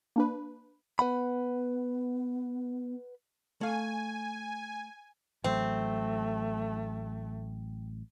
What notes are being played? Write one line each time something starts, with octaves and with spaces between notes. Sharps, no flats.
A#3 D4 B4
B3 B4 F#5 B5
A3 F5 G#5
A1 F#3 A3 C4